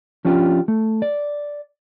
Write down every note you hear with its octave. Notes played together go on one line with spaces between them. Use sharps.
F3 C#4 D4 F4 G4
A3
D5